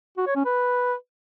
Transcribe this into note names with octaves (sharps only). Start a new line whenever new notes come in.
F#4
C#5
C#4
B4